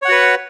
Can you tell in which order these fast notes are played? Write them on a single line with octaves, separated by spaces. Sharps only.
C#5 F#5 F#4 B4